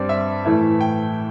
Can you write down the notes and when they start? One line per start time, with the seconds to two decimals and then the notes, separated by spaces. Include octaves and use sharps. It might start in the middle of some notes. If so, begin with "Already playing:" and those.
Already playing: G2 G3 C4 D5
0.09 E5
0.45 A2 E3 A3 E4
0.81 G5